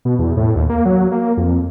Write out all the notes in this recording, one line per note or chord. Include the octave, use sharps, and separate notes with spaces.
B2
E2
A2
D#2
A#3
F#3
A#3
F2